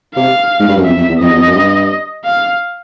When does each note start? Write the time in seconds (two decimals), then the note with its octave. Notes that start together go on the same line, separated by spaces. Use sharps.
0.16 C3 F5
0.60 G#2
0.69 G2
0.76 F#2
0.85 F2 E5
0.97 F2
1.09 E2
1.20 F2 D#5
1.30 E2
1.38 F2
1.47 F#2
1.55 G2
2.25 F5